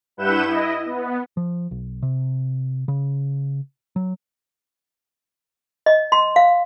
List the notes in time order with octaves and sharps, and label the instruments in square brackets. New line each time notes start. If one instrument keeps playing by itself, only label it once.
[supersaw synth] G2 E4 B4 F#5 G6 E7
E4 D#5
B3
[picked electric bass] F3
B1
C3
C#3
F#3
[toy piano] D#5
C6
F5